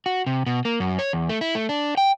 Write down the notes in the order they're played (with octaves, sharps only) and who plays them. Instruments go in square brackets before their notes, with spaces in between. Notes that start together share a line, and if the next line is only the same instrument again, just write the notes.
[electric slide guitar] F#4
C3
B2
A#3
F#2
C#5
E2
A3
E4
A3
D4
G5